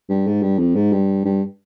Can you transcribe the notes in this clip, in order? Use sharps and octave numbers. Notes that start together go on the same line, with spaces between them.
G2
G#2
G2
F2
G#2
G2
G2